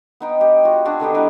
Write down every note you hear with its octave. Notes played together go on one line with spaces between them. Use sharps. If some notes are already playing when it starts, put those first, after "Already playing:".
B3 D#4 G5
G4
F4 F#4
C4 D4 F#4 G#4
D3 D#3 B3 G4
G#3 E4 A#4 B4